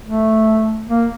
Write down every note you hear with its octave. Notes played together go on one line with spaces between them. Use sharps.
A3
A#3